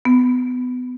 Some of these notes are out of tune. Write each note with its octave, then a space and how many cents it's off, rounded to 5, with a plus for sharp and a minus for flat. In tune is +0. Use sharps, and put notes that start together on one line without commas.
B3 +25